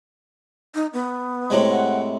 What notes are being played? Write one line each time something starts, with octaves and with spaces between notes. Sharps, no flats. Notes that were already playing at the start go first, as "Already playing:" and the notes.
D#4
B3
A2 C3 G#3
F#5